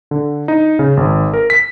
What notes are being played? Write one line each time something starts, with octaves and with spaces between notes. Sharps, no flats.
D3
D#4
C#3
G#1
A#4
B6